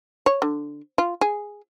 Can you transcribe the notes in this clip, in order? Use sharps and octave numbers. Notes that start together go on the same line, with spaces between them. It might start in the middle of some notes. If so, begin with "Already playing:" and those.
C#5
D3
F4
G#4